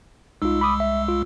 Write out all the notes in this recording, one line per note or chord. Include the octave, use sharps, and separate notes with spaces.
C2 G#3 D#4 F4 E6
B5 D6 D#6
E5
F4